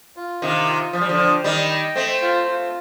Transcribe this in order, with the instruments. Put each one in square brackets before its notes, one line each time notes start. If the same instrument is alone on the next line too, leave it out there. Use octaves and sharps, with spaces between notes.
[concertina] F4
[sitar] C3 D#3 [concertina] F5
[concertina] F4
[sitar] F3 [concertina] C5
[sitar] G3
D3 F3
[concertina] G5
[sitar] D#3 G3 [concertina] D#5
[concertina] G5
[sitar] A3 C4 [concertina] C5
[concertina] F4
F4